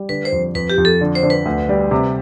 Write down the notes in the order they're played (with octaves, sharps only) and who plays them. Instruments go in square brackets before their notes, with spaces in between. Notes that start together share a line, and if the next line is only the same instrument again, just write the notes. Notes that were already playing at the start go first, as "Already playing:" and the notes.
Already playing: [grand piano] G3
[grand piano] D3 [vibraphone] B4
[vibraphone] C5
[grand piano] F2
[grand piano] F2 [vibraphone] B4
[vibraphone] G4
[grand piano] F2
[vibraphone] A4
[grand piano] D3
[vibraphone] C5
[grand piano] D3
[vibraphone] B4
[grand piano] D2
G3
C3